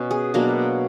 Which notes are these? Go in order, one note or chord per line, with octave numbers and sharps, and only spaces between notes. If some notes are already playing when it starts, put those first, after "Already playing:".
Already playing: B2 C#4
G#4
B2 F#3 A#3 D4